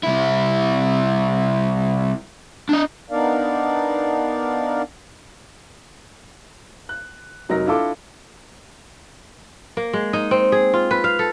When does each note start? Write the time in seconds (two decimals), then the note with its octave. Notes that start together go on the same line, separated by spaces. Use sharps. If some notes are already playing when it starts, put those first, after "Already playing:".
0.03 C2 E4
2.69 D4 D#5
3.10 B3 D4 D#4 A#4 D5 F5
6.89 F#6
7.49 F1 F#3 D#4 A#4 A#6
7.66 D4 E4 F4 A4 D6
9.77 A#3
9.93 G#3
10.13 D#4
10.31 C4
10.52 G#4
10.74 F4
10.91 B4
11.04 F5
11.19 A4